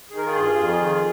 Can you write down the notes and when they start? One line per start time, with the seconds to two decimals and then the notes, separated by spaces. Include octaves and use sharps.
0.10 D#3 G#4
0.18 A#4
0.25 F4 G#4
0.34 G2
0.57 F2
0.79 D#3